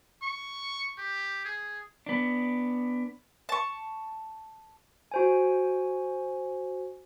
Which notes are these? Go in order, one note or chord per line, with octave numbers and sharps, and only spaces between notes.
C#6
G4
G#4
B3 D4
A5 C#6
F#4 C5 G#5